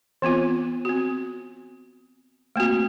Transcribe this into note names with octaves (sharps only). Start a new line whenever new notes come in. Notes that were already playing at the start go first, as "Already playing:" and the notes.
E3 B3 C4 F4
C4 F#4
A3 A#3 C4 F#4